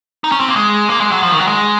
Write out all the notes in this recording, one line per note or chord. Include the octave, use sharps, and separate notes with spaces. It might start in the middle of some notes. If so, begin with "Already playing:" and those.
D#4
C#4
C4
A#3
G#3
A#3
G#3
F#3
F3
D#3
F#3
G#3